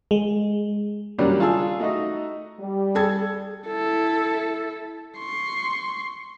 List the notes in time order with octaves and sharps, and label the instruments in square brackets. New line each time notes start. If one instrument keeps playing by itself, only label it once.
[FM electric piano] G#3
[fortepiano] C#3 F#3 G3 A#3 D4
F4 G#4 A5 E6
A3 D#4 F#4 D#5
[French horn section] G3
[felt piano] G#4 A4 G#6
[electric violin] E4 A4
C6 C#6